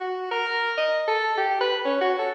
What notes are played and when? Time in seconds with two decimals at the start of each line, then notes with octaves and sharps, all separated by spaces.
0.01 F#4
0.31 A#4
0.78 D#5
1.08 A4
1.38 G4
1.61 B4
1.85 C#4
2.01 F#4
2.19 A4